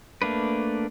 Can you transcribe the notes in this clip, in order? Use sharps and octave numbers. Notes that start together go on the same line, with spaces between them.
A3 A#3 D4 B4